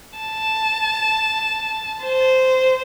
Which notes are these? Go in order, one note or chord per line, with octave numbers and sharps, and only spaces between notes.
A5
C5